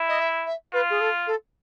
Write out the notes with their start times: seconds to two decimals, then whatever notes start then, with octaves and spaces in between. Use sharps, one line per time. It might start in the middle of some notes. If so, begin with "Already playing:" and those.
Already playing: E4
0.08 D#5
0.20 E5
0.46 E5
0.73 F4 B4
0.90 G#4
1.00 A4
1.27 A4